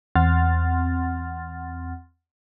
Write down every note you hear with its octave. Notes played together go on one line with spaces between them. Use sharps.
E2 C4 F#5 C6 F6 A6